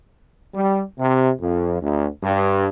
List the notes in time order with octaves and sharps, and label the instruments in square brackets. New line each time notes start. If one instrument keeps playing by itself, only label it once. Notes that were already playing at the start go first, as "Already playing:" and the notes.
[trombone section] G3
C3
F2
D2
G2